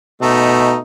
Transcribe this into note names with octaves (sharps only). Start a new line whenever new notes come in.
B2 A3 D#4